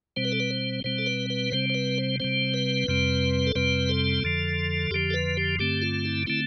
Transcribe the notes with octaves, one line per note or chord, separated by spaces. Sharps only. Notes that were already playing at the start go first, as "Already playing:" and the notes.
B2 G3 C4 C5
B4
A4
B4
C5
B2 G3 C4 C5
A4
B4
B4
C3 G3 C4 C5
C5
B4
C5
C3 G3 C4 C5
B4
F2 C3 G3 C4
A4
F2 C3 G3 C4 B4
A4
F2 D3 F3
F2 D3 F3 G4
A4
B4
G4
G2 D3 A3 C4 G4
F4
E4
D3 A3 C4 E4